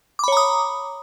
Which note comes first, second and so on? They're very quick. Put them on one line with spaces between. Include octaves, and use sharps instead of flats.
D6 B5 C#5 A#5 D#6